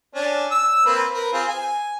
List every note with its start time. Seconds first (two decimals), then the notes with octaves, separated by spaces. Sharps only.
0.15 C#4 D4
0.51 E6
0.86 A#3 C4 B4
1.14 A#4 B4
1.33 C4 F4 G#4
1.48 G#5